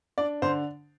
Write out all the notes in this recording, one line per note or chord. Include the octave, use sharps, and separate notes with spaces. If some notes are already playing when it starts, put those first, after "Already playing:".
D4 D5
D3 C5